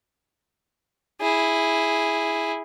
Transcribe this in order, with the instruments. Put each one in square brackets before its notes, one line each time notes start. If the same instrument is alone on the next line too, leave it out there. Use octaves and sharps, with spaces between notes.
[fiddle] E4 G#4